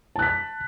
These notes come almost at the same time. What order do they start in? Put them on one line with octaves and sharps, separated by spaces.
A5 F#6 B6